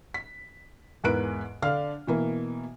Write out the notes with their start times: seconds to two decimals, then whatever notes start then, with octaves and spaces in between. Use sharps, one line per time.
0.14 B6
1.04 E2 G#2 A#4 B4 F#6 D7
1.62 D3 D4 F5 F6
2.07 B2 E3 A#3